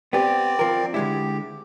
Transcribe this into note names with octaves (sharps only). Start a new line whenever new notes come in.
B3 C4 G4 D5
F3 A#4
D3 G#3 E4 G4